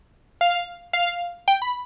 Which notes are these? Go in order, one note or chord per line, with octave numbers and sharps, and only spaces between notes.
F5
F5
G5
B5